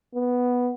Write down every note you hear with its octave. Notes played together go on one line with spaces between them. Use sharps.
B3